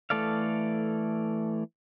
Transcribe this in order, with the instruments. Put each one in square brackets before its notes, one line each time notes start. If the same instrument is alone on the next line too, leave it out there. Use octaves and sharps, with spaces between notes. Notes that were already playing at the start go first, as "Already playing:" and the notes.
[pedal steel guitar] E3 A3 A4 D5 F5